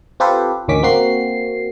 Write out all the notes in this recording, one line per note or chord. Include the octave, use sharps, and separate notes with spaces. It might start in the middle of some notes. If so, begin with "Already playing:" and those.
C4 F4 G4 A4 B4 C5
A1 D2 D#3 C#4 D6 B6
A#3 C4 F#4 C7